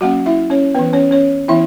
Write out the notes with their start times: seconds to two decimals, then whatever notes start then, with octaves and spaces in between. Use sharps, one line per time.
0.01 F#3 A#3 C#4 F#4 F#5
0.26 E4 E5
0.50 C#4 C#5
0.75 B3 B4
0.79 E3
0.93 C#4 C#5
1.11 C#4 C#5
1.48 E3 B3 E4 E5